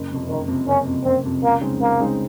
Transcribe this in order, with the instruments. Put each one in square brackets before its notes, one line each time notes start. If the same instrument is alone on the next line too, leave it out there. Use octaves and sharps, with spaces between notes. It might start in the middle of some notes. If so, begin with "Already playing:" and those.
Already playing: [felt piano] F#1
F2 C3
[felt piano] F#1 [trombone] D#3
[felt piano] F2 C3
[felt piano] F#1 [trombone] C#4
[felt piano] F2 C3
[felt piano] F#1 [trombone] C4
[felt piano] F2 C3
[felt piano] C#2 [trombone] A#3
[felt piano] C#3 G#3 C4 D#4
[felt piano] C#2 [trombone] A#3
[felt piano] C#3 G#3 C4 D#4